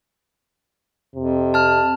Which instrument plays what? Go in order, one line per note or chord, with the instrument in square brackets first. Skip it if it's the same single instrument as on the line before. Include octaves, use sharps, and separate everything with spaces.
[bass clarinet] F2 [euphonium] C3
[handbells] A5 F6